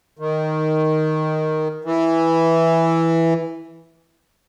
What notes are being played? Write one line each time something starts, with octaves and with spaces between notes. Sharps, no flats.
D#3
E3